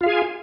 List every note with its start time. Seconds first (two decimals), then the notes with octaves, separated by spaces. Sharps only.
0.01 F4
0.03 F5
0.06 G#4
0.09 G#5